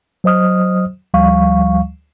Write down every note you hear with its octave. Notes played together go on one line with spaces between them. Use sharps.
F#3 C5 D#5 D#6 F6
D2 F3 G3 F5 C#6